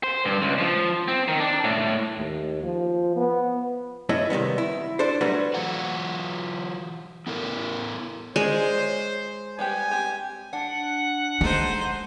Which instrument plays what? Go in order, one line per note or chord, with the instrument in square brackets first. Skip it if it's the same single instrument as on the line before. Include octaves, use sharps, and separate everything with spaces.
[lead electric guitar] C5
G2
C#2
F3
C4
D#3
D4
A2
[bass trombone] D#2
F3
B3
[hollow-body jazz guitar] F#2 A3 E4 C#5 D#5
C3 D#3 G3 B3
E4
D4 A4 C5
F#3 G3 A3 F#4 B4
[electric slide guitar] E3 F#3 F4 F#4 F#5
B3 E4 A4 A#4
[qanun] G#3 [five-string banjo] C#4 A#4 D5 [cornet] C5
[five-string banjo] C#5
[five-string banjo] G3 B3 G4 [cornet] G#5
[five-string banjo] C4 G4
[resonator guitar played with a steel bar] D4 [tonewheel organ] F#5
[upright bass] G#3 [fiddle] D#4 C5 [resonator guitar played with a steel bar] G4 A4